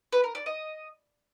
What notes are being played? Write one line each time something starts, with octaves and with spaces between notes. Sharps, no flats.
B4
A#4
D5
D#5